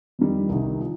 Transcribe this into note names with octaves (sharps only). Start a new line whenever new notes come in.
F2 D#3 G3
C2 C3 D#3
F3